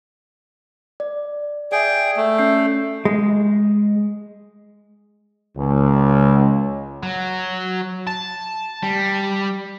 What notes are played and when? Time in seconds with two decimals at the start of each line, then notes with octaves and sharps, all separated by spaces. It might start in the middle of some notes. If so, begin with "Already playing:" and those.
1.00 D5
1.72 G#4 D5 E5 G5
2.17 A3
2.39 C#4 G6 C7
3.05 G#3
5.56 C#2
7.03 F#3
8.07 A5
8.83 G3